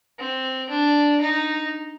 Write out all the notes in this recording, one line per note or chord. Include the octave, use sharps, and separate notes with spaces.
C4
D4
D#4